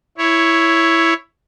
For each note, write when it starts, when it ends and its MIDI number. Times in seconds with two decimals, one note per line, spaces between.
0.18 1.14 64
0.18 1.14 73